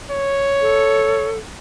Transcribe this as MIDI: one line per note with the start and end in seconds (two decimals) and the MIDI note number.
0.11 1.33 73
0.61 1.39 69